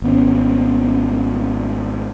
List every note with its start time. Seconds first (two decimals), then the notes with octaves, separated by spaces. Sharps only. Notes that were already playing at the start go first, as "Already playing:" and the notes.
0.02 G#1 B3 C#4